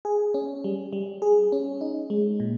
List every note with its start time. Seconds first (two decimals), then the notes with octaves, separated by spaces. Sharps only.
0.05 G#4
0.34 C#4
0.64 G3
0.93 G3
1.22 G#4
1.52 C#4
1.81 D#4
2.10 G#3
2.40 A#2